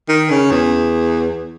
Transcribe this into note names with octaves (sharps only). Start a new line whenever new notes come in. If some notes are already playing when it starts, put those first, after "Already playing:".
D#3
C#3
E2